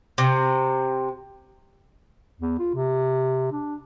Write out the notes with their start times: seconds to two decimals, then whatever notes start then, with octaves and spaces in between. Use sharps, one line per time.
0.18 C3
2.40 E2
2.59 F4
2.75 C3
3.52 D4